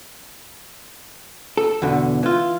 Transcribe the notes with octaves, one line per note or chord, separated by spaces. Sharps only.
A4
E2 B2 D3
E3 F4